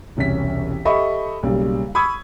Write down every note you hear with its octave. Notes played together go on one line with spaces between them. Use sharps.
E1 C2 C#4 B6
G4 A4 D#5 E5 B5 C#6
B1 C#3 G3 A#3
B5 C#6 D#6 E6 G#6